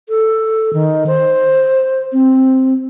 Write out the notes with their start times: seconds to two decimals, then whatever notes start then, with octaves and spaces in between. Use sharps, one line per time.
0.09 A4
0.73 D#3
1.07 C5
2.13 C4